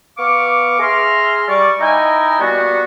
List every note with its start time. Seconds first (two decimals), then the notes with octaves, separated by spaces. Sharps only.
0.18 B3 F5 C#6 D6
0.79 G#4 E5 A#5 C6 F6
1.48 G3 D5 C#6
1.79 D#4 E4 D#5 G5 G#5 A#5
2.40 G3 A#3 B3 F#4